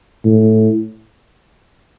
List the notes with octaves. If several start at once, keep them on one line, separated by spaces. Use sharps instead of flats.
A2